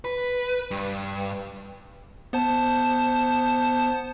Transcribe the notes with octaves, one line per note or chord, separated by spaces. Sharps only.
B4
G2
B3 C5 A5